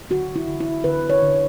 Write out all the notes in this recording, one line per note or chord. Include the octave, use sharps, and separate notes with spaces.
D3 F#4
E4
D3
E4
D3 B4
C#5
D3